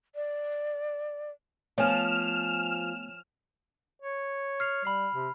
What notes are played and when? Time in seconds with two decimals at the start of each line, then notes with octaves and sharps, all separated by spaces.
0.15 D5
1.78 F3 A3 B3 C#5 G#5 F6 E7
4.02 C#5
4.60 F6 C7 F7
4.85 G3 B5 C7
5.14 C3